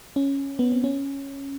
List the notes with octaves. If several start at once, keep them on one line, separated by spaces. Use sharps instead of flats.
C#4
B3
C4
C#4